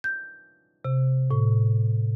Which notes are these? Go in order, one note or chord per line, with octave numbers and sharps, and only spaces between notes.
G6
C3
A2